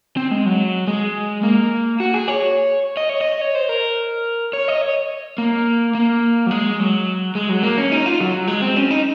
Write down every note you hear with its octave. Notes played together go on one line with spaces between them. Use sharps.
C4
G#3
F#3
G#3
A#3
F#4
G#4
C#5
D#5
C#5
D#5
C#5
C5
A#4
C#5
D#5
C#5
A#3
A#3
F#3
G#3
F#3
G#3
F#3
A#3
C#4
D#4
F4
F#3
G#3
C4
C#4
D#4